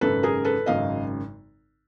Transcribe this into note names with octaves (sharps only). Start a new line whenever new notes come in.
G#1 F#2 C#3 A4 B4
G#4 A#4
A4 B4
G#1 F#2 C#3 D#5 F5